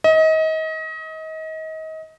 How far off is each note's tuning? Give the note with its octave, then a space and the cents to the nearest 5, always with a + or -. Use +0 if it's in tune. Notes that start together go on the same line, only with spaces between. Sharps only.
D#5 +30